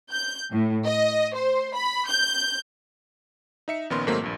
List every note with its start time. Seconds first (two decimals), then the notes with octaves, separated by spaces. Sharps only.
0.12 G6
0.52 A2
0.86 D#5
1.35 C5
1.75 B5
2.09 G6
3.68 D#4 E5 C#7
3.90 A#1 D#3 B3 C#4 A#4 C6
4.07 G#2 D#3 F#3 A3 A#3 C4
4.21 A#1 G2 A#2